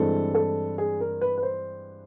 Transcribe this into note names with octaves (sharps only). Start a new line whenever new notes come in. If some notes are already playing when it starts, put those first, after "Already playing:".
Already playing: G2 E3 G#3 C4 A4
A4
G#4
A#4
B4
B4
C5